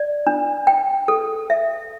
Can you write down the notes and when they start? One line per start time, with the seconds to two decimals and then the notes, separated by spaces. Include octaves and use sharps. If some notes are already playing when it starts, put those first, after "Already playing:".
Already playing: D5
0.27 D4
0.67 G5
1.08 A4
1.50 E5